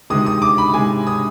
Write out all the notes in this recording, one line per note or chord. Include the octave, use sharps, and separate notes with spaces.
C3 D#3 G#3 D#6
D#6
D6
B5
C3 D#3 G#3 G#5
D#6